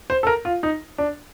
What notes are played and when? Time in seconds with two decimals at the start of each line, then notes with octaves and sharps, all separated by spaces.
0.10 C5
0.23 A4
0.27 A#4
0.45 F4
0.63 D#4
0.98 D4